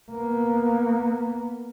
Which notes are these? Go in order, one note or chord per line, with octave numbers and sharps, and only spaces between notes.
A#3 B3